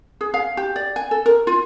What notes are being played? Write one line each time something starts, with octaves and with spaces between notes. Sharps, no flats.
G#4
F5
G4
D5
G#5
A4
A#4
F4